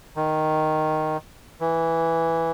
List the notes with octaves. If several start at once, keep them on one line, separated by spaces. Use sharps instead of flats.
D#3
E3